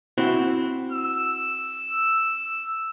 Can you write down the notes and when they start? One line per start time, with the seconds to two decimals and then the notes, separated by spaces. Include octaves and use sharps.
0.18 C4 E4 F#4
0.92 E6